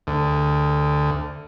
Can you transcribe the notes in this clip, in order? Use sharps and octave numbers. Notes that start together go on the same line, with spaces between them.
D2